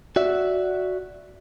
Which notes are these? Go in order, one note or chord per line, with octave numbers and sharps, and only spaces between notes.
F#4 D5 E5